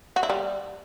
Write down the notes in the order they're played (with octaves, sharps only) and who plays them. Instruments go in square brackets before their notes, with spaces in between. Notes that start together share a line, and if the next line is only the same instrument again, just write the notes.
[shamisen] F#4
E4
G3